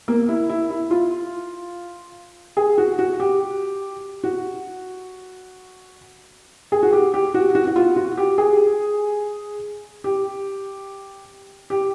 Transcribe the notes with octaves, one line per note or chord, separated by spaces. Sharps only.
A#3
E4
E4
E4
F4
G#4
F#4
F#4
G4
F#4
G#4
F#4
G4
G4
F#4
F#4
F#4
F4
F#4
G4
G#4
G4
G4